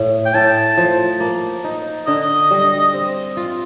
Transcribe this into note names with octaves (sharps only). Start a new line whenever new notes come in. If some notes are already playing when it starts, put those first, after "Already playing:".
Already playing: A2
G5
A2 A5
F3
A#3
D#4
D3 D#5
G3
C4
F4